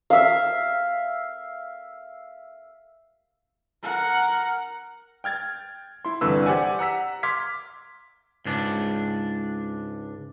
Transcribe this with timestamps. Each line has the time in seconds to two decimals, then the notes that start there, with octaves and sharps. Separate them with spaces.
0.10 E5 F5
3.83 A#4 F#5
5.24 G5 F6 G#6 A6
6.05 E4 C6
6.21 C2 G2 D3 E3 B4 E6
6.46 G4 C5 D5 F#5 G#5
6.79 F#5 A#5 E6 B6
7.23 C6 D6 F6 G#6 B6
8.46 C#2 G#2 D4